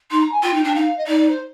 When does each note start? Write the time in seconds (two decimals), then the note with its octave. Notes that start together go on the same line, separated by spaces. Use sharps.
0.11 D#4 C6
0.21 A#5
0.32 G#5
0.43 F4 G5
0.54 D#4
0.64 D4
0.75 D#4 F5
0.98 D#5
1.07 D#4 D5
1.18 D5
1.29 C5